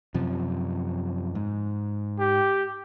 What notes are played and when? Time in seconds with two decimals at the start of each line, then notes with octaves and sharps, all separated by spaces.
0.14 F#2 C3 F3
1.35 G#2
2.19 G4